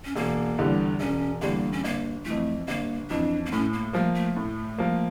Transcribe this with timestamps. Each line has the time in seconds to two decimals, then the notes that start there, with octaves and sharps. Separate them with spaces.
0.05 C#4
0.16 E1 A#3
0.58 E2 D3 G3
1.00 E1 C#4
1.41 E2 D3 G3 A#3
1.73 C#4
1.84 G1 A#3
2.25 F2 E3 A3
2.68 G1 A#3
3.10 F2 E3 D4
3.46 A#3
3.52 A2 C#4
3.73 A#3
3.93 F3 A3 A#3
4.15 A3
4.36 A2
4.78 F3 A#3